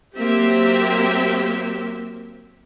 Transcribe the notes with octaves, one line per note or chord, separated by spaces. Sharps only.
F#3 A#3 C4 G4 E5